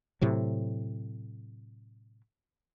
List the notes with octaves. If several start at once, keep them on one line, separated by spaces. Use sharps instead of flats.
A2 C3 F#3